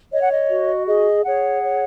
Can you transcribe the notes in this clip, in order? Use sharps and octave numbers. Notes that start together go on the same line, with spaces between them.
C#5 D#5
F#5
D#5
F#4
G#4 D#5
G#4 C#5 F#5
C#5